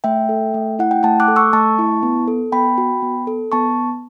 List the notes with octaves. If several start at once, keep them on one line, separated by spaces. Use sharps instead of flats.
A3 E5 G5
A4
A3
E4 F#5
G5
A3 F#5 A5
D6 F#6
A4
C#6 E6
A3 A5 C#6
E4
B3
A4
B3 G5 B5
F#4
B3
A4
B3 A5 C#6